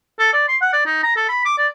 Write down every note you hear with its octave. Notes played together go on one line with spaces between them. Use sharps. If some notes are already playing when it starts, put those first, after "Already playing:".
A4
D5
C6
F#5
D5
D#4
A#5
A4
B5
D6
D5